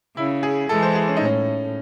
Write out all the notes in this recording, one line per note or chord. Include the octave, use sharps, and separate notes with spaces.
C#3 E4
G#4
E3 G#3 A4
C5
G#4
C#4
D#4
A2 C#4